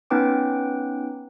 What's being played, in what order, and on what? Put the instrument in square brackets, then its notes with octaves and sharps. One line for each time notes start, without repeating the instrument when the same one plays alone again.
[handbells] B3 C#4 D#4 B4 G5 D6